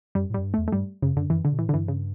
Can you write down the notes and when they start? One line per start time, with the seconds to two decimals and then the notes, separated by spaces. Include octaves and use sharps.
0.15 F#2 G3
0.29 A2 G3
0.38 F#2
0.44 G2
0.54 A3
0.58 E2
0.68 A3
0.72 G2 G3
1.02 F#2 C#3
1.16 F#2 D3
1.30 F#2 E3
1.45 D3
1.52 B2
1.59 A2 E3
1.69 D3
1.73 G2 E3
1.88 C#3